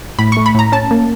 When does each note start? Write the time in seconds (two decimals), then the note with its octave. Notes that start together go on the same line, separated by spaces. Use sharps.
0.19 A2 B5
0.32 C#6
0.37 A3
0.46 B5
0.55 A2 A#5
0.72 C#4 A5
0.91 A#3